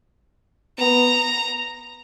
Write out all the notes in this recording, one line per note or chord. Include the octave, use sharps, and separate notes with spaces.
B3 A#5